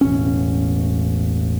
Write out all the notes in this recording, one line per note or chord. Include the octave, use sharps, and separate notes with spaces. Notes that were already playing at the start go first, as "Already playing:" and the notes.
E1 A1 C#4